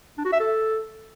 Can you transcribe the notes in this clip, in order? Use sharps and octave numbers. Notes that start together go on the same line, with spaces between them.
D4
F#4
E5
A4